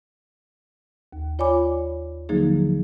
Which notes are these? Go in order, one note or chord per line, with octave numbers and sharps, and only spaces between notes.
D#2
F4 C#5 D5 G#5 B5 D6
D3 F3 F#3 A#3 D#4 G#4